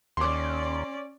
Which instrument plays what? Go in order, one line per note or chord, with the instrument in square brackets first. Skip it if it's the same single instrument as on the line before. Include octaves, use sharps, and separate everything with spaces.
[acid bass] D#2 [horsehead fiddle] C#4 D5 [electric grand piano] C6 D6